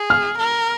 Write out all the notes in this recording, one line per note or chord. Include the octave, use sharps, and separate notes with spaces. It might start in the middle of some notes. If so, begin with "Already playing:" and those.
Already playing: G#4
F6
A#4